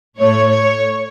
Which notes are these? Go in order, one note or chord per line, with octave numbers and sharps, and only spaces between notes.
A2 A3 C#5
C#5